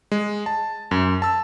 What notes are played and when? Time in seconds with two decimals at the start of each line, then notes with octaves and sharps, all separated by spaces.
0.12 G#3
0.46 A5
0.91 F#2
1.22 A5 E6